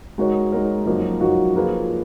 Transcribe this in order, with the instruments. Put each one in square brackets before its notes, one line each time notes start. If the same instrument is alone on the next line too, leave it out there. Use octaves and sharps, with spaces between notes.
[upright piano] G#3 D#4 F#4 A#4 C#5
G#3 D#4 F#4 A#4 C#5
F#2 F3 A#3 D#4 F#4
F#2 F3 A#3 D#4 F#4
F3 A#3 F4 G#4 B4